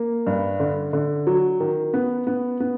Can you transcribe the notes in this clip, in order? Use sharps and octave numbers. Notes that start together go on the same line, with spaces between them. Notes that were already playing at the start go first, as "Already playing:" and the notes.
Already playing: A#3
G2
D3
D3
F#3
D#3
B3
B3
B3